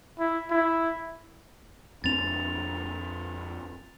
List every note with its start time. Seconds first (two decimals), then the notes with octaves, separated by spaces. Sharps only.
0.19 E4
0.51 E4
2.04 F2 C4 D4 A6 F7